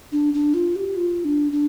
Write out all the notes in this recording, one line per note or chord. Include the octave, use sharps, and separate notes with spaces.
D4
D4
F4
G4
F4
D4
D4